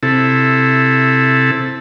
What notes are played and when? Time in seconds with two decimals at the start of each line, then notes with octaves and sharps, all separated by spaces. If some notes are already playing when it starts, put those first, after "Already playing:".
0.03 C3 E4 A4